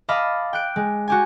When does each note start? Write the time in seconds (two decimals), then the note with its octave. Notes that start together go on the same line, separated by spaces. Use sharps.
0.09 D#5 F5 A5 B5 D6 F6
0.53 G5 F#6 D7
0.76 G#3
1.08 F#4 G4 G#5